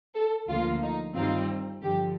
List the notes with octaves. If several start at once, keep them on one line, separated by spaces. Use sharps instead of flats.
A4
D2 D3 F3 A#3 F4
D#4
G2 D#3 G3 C4 D#4 F4
G2 D3 F3 G4